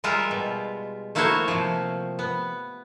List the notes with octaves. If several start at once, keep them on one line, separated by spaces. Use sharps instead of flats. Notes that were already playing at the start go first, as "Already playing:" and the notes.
G3 G#3 F4 A#4 E5
B2
A3 A#3 E4 F#4 C5 C#5
C3 F3
B3